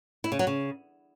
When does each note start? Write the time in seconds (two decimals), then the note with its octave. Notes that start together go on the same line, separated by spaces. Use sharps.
0.24 E4
0.32 C#3
0.39 F#3
0.47 C#3